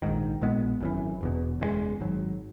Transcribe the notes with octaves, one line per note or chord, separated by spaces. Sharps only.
A#1 G#2 D#3
A#1 A#2 G#3 B3
G#1 F#2 E3
E1 E2 B2
F#1 E2 C#3 G#3
G#1 G#2 F#3